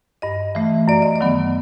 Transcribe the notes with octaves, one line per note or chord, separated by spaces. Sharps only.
G2 D#5
E3 A3
F#2 D5
D#5
D5
D#3 F#3 B3